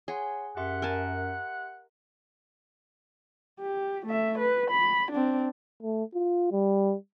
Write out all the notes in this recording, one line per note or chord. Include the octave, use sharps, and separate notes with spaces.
G#4 C#5 F#5 C6
F#2 G4 E5 F#5 C6
A#4 G#5 A5
G4
A3 E5
B4
B5
C4 D4
A3
F4
G3